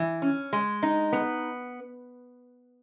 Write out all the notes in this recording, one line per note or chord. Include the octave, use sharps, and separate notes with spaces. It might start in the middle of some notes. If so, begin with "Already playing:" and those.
Already playing: E3
C#4
G#3
D#4
B3